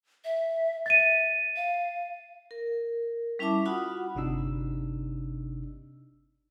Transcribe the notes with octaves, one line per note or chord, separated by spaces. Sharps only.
E5
E5 A6 D#7
F5
A#4
G3 C#4 E4 E5 A5 D6
F4 F#4 F#5 B5 D#6
G1 C3 D4 D#4 E6